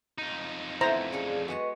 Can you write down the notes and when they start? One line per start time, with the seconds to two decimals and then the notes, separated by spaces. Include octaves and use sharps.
0.18 F2 D#4
0.81 A3 B3 E4 C5 A#5
1.12 C#4 G#4 A4 D5 F5
1.48 G#3 B3 F#4 B4 D#5 C#6